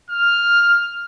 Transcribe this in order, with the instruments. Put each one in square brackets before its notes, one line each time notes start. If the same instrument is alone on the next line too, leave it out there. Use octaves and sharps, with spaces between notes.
[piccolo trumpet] F6